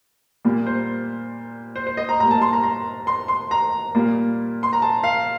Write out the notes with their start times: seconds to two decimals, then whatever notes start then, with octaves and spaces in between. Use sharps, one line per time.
0.45 A#2 G3 A#3
0.66 C5
1.76 C5
1.87 C5
1.97 D#5
2.09 A#5
2.20 A2 G3 A#3 A#5
2.31 A5
2.42 C6
2.53 A#5
2.63 A#5
3.07 C6
3.28 C6
3.51 A#5
3.95 A#2 G3 A#3
4.63 C6
4.73 A#5
4.82 A5
5.04 F5